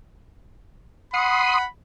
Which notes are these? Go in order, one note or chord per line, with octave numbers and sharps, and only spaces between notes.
F#5 B5 C6 D#6